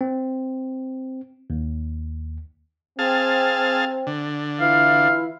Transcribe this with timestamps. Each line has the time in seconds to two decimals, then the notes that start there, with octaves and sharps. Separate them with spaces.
0.01 C4
1.50 D#2
2.99 C4 G#4 F5 A5
4.07 D3
4.60 E3 E4 F4 F5